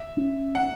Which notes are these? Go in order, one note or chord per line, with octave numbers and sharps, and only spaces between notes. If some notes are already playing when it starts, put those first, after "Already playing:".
Already playing: E5
C#4
F#5